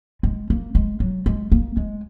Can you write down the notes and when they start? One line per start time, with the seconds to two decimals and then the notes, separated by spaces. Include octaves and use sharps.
0.23 G#3
0.50 A#3
0.75 G#3
1.00 F#3
1.26 G#3
1.52 A#3
1.77 G#3